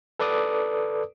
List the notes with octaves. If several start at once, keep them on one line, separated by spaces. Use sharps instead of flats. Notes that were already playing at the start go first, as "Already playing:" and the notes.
A4 B4 D5 D6 D#6